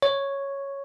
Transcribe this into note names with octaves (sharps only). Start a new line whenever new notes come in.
C#5